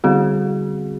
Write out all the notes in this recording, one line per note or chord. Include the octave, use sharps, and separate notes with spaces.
D3 G3 C4 F#4 G#4